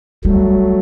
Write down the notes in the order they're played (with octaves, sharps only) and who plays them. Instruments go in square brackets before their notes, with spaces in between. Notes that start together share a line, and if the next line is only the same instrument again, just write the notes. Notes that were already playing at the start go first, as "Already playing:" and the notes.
[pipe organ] F#3 A3 [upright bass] G3